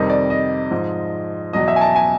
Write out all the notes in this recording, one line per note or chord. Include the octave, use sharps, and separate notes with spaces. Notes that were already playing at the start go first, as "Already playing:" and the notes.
Already playing: F2 C3 D#3 G3 D#5
D5
D#5
G#2 F3
E2 B2 F#3 D#5
E5
G#5
A5
G#5